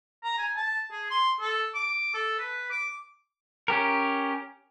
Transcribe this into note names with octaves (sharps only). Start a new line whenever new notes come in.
A#5
G#5
A5
G#4
C6
A4
D6
A4
B4
D6
C#4 G4 A#4